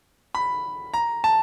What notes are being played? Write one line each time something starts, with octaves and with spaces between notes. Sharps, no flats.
B5
A#5
A5